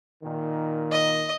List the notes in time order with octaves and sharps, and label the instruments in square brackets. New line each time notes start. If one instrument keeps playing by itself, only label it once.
[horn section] A#2 D#3
[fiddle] D#5